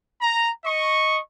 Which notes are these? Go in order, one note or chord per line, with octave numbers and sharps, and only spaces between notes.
A#5
D#5 C#6